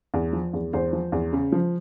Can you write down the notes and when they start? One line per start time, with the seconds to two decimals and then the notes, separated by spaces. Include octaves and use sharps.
0.14 E2
0.33 F3
0.53 E2
0.73 E2 C5
0.93 F3
1.12 E2
1.33 C#3
1.52 F3